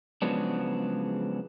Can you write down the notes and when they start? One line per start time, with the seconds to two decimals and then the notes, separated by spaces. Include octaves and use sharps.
0.22 C#3 F3 F#3 G#3 B3 D4